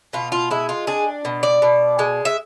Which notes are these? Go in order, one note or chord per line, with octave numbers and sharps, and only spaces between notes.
B2 F4
F4
G#3 E4
F4
D4 G#4
B2
D5
B2
G#3
E5